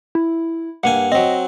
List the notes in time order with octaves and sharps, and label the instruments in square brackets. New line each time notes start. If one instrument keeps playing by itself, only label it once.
[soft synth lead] E4
[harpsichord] G2 A#3 G#5 [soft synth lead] F#5
[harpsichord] F#3 C4 [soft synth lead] D#5